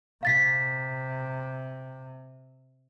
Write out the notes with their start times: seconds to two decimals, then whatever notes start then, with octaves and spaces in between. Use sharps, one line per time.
0.23 C3 F5 A6 B6